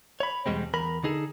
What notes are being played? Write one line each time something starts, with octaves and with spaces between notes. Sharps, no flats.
C#5 B5
E2 G2 B2 G3 G#3 C4
E2 A#4 B5
D3 D#4 G#4 A4